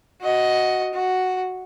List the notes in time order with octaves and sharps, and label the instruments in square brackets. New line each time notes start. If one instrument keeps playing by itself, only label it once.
[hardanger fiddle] F#4 D#5
F#4